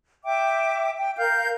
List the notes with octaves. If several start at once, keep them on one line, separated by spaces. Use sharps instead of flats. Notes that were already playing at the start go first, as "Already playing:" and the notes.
E5 G5 D6
G5
A#4 F5 G6